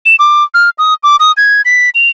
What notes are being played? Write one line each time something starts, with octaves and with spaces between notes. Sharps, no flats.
E7
D6
F6
D#6
D6
D#6
G#6
B6
F7